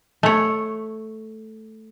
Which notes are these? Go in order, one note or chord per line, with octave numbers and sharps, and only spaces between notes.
A3 C#5